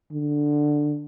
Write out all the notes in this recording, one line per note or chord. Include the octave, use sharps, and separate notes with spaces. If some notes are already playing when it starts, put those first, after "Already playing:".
D3